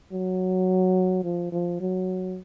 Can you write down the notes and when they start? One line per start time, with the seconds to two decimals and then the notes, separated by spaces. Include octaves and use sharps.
0.12 F#3
1.24 F3
1.52 F3
1.81 F#3